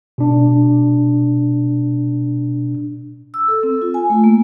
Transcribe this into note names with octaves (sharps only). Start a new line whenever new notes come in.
B2 D4
E6
A4
C4
F4
G#5
A3
A#3